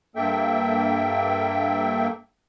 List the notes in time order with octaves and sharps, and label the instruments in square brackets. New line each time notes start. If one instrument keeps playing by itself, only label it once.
[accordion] G2 A#3 A4 E5 G5